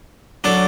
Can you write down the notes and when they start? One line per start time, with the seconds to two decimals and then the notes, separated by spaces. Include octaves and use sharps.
0.44 F#3 D4 A4 D5